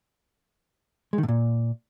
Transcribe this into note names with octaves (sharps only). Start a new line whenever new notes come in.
G#3
D#3
A2
A#2